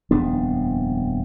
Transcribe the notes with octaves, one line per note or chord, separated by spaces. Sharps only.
D#1 F2 B3 D4